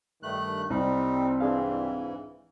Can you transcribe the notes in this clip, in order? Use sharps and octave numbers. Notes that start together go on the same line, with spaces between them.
G2 D#3 A3 F#6
C2 G3 C4 D#4
G#2 E3 D4 G#4 F5